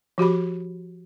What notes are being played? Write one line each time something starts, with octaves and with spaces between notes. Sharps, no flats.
F3 F#4 G4 B5